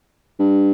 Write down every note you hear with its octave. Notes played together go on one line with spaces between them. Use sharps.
G2